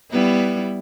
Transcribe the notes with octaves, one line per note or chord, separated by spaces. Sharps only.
G3 B3 E4